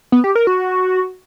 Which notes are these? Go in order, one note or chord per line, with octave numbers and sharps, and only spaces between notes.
B3
G4
A#4
F#4